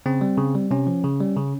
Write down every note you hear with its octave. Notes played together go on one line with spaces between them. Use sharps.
C#3 C4
G3
C#3
G3
C3 C#4
F3
C#3
G3
C#3